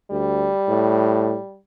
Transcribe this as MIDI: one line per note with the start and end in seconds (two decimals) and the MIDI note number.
0.11 0.50 38
0.11 1.58 55
0.68 1.37 45